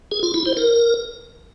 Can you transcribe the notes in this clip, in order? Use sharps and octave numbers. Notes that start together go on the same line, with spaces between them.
G#4
F4
E4
C5
A#4